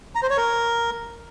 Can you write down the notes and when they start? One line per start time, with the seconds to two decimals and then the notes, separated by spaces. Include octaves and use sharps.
0.15 A#5
0.23 C5
0.30 C#5
0.37 A#4